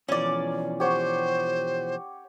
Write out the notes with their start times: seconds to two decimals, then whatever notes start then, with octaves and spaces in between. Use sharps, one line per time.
0.08 B2 E3 F3 C#4 D5
0.80 G4 C5 C#5 F#5